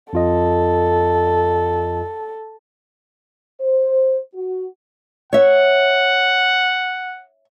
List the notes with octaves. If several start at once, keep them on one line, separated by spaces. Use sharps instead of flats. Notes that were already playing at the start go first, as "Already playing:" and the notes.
F2 F4 A4 D#5
C5
F#4
C#5 E5 F#5